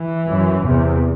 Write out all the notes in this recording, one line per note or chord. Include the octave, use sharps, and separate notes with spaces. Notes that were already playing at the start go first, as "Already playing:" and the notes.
Already playing: E3
F#2
E2 C3